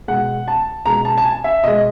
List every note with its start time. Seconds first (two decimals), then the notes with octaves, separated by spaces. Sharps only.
0.08 B2 G#3 F#5
0.48 A5
0.86 B2 G#3 A#5
1.05 A5
1.18 A5
1.25 G#5
1.44 E5
1.64 B2 G#3 D#5